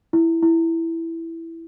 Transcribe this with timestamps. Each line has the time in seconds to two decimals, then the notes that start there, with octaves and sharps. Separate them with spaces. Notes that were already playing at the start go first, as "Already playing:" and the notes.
0.13 E4
0.43 E4